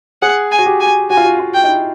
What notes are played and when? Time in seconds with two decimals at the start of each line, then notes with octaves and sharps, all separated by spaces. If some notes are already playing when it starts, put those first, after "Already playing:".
0.22 G#4 F#5
0.51 G#5
0.59 F#4
0.66 G4
0.80 G#5
1.10 F#4 G#5
1.17 F4
1.25 F#4
1.40 F4
1.54 G5
1.64 D#4
1.69 E4